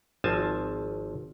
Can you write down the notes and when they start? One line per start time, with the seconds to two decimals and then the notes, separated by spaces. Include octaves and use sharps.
0.24 G#1 F3 C4 G#5 A5